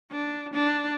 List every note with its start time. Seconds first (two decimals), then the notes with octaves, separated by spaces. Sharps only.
0.12 D4
0.54 D4